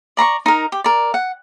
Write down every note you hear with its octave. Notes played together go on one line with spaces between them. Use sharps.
D5 A#5 C6 C#6
D#4 A#4
G4
A#4 D5
F#5